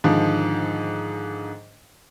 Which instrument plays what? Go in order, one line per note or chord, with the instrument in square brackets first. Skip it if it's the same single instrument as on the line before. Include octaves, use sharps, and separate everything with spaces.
[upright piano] G#2 D3 D#3 F3